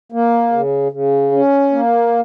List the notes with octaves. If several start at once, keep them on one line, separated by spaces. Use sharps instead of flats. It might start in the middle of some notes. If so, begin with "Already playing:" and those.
A#3
C#3
C#3
C#4
A#3